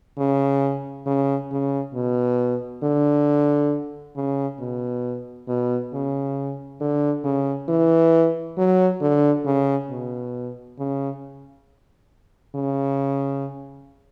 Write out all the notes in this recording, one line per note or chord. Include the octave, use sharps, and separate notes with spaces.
C#3
C#3
C#3
B2
D3
C#3
B2
B2
C#3
D3
C#3
E3
F#3
D3
C#3
B2
C#3
C#3